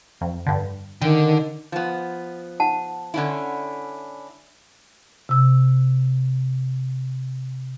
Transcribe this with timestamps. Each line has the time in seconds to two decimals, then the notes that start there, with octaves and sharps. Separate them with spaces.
0.21 F2
0.46 G2 D3
1.02 D3 D#3 G5
1.72 F3 B3
2.60 F#5 A5
3.14 D3 C#4 E4
5.29 C3 E6